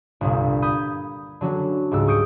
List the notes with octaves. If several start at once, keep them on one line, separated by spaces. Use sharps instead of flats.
G1 C2 A#2
B5 D#6 G6 G#6
D3 F#3 C#4 D4
C#2 G#2 G3 E6
C#6 D#6 G6 C#7 D7